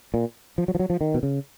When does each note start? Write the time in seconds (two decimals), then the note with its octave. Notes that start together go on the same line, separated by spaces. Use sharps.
0.14 A#2
0.58 F3
0.68 F#3
0.75 F3
0.79 F#3
0.90 F3
1.01 D#3
1.14 B2
1.23 C#3